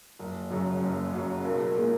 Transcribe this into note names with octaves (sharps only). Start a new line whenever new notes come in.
F#1
F#2 C#3 F#3
F#1
F#2 C#3 F#3
B1 A#4
G#4
A#2 G#3 A#3